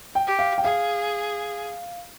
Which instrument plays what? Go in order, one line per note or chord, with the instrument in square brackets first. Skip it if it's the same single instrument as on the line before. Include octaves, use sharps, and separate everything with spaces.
[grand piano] G5
[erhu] G4
[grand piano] F5
G5
[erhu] G#4 [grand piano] F5